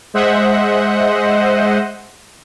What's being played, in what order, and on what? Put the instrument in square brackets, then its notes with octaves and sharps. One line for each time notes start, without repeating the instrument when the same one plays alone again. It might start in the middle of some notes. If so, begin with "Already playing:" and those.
[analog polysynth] G#3 C5 D#5 E5 F#5